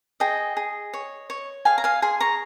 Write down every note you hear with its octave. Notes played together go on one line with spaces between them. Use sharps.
G#4 D#5 G5
G#4
C#5
C#5
G#4 F5 G#5
A#5
F5 G#5
G#4 G#5 C6
A#5 C#6